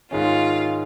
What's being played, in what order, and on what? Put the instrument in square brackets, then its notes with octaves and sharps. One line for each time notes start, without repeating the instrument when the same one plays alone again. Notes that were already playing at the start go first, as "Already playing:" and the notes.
[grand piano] G#2 D#3 G#3 C#4 [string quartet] F4